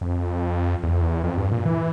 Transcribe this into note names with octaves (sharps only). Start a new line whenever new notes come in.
F2
E2
F2
E2
F2
G2
A#2
E3